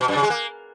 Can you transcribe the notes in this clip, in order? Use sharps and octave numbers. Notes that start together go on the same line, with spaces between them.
B2
F#2
C#3
G#3
A#3